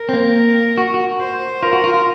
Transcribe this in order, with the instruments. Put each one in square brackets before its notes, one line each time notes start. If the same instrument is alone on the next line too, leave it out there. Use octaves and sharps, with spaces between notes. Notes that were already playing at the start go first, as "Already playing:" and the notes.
Already playing: [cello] A#4
[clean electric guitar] C4
A#3
F#4
F#4
[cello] C5
[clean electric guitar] F4 [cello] A#4
[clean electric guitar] F#4
F4
F4